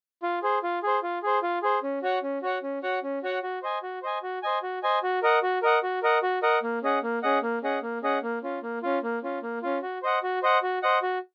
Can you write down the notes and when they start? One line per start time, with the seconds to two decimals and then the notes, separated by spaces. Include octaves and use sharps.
0.23 F4
0.43 G#4 C5
0.63 F4
0.83 G#4 C5
1.03 F4
1.23 G#4 C5
1.43 F4
1.63 G#4 C5
1.83 C#4
2.03 F#4 C#5 F#5
2.23 C#4
2.43 F#4 C#5 F#5
2.63 C#4
2.83 F#4 C#5 F#5
3.03 C#4
3.23 F#4 C#5 F#5
3.43 F#4
3.63 C5 D#5 G#5
3.83 F#4
4.02 C5 D#5 G#5
4.23 F#4
4.43 C5 D#5 G#5
4.63 F#4
4.83 C5 D#5 G#5
5.03 F#4
5.23 A#4 D#5 F#5
5.43 F#4
5.63 A#4 D#5 F#5
5.83 F#4
6.03 A#4 D#5 F#5
6.23 F#4
6.43 A#4 D#5 F#5
6.63 A#3
6.83 C#4 G#4 D#5 F#5
7.03 A#3
7.23 C#4 G#4 D#5 F#5
7.43 A#3
7.63 C#4 G#4 D#5 F#5
7.83 A#3
8.03 C#4 G#4 D#5 F#5
8.23 A#3
8.43 C#4 F4
8.63 A#3
8.83 C#4 F4
9.03 A#3
9.23 C#4 F4
9.43 A#3
9.62 C#4 F4
9.82 F#4
10.03 C5 D#5 F#5
10.23 F#4
10.43 C5 D#5 F#5
10.63 F#4
10.83 C5 D#5 F#5
11.02 F#4